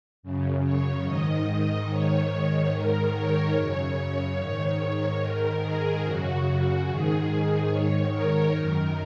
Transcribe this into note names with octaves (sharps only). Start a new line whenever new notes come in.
F#2 C#3
C#5
G#2 D#3 D#5
G#2 D#3 C#5
G#2 D#3 A#4
C#5
F#2 C#3
G#2 D#3
G#2 D#3 A#4
G#4
F#2 C#3 F#4
G#2 D#3 G#4
G#2 D#3 C#5
A#4
F#2 D#3 A#4